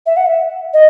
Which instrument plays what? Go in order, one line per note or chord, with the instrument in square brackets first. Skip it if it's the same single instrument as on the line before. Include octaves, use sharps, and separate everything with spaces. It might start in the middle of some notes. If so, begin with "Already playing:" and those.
[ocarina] E5
F#5
E5
D#5